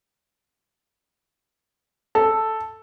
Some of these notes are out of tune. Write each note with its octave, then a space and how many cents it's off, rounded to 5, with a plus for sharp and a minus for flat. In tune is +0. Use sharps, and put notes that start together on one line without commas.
A4 +0